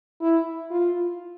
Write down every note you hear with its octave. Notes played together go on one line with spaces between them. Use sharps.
E4
F4